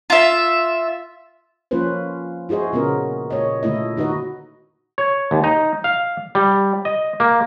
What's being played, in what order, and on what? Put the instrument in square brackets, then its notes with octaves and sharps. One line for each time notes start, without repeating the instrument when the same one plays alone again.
[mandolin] F4 E5
[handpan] F3 A#3 C#4 F4 B4 C5
E4 F#4 G#4 C5 D#5
A#2 C#3 B3 C#4 A#4
A#2 C#5 D#5
A#2 D3 A3 E4 D#5
D#3 D#4 F#4 B4 D#5
[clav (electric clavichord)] C#5
D#2
D#4
F5
G3
D#5
A#3